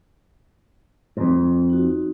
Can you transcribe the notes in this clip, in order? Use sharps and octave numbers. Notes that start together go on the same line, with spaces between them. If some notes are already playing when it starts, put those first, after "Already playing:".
F2 G#2
D#4 F#4